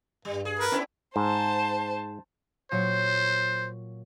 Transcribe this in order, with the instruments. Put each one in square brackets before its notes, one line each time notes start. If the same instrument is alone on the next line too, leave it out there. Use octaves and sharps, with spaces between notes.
[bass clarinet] G2 [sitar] G3
[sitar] G#4
[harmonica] A#4 B4
[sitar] B3 D4 E4 [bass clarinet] C#4
[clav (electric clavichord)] G#2 [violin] C5 A5
[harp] A#2 F#3 C#5 [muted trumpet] C5